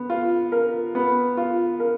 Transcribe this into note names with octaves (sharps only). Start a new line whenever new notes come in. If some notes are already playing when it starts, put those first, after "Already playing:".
Already playing: B3
F4
A#4
B3
F4
A#4